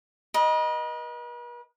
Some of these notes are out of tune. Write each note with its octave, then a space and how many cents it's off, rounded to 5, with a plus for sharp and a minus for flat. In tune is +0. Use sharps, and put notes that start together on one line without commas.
B4 -45 D#5 +0